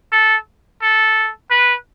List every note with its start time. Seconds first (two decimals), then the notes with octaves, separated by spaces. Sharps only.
0.12 A4
0.82 A4
1.50 B4